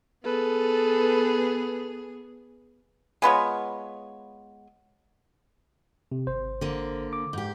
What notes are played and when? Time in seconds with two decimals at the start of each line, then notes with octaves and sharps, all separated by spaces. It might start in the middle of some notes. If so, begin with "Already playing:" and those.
0.24 B3 G#4 A4 B4
3.22 G#3 B3 F4 C#5
6.12 C3
6.27 G#1 C5
6.61 D3 A#3
7.13 D6
7.33 G#2 G4